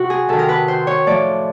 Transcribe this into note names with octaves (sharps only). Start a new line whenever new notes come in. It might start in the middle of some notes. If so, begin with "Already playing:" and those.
Already playing: C3 F#4
G#4
C3 D#3 A4
A#4
B4
C5
C#5
A2 F3 D5